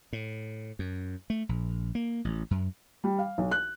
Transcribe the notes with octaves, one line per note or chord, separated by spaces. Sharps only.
A2
F#2
A3
A#1
A#3
A1
F#2
G3
F5
B1
F#6